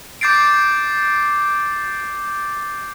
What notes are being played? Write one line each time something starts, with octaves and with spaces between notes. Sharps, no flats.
D6 G6 A6 C7 D7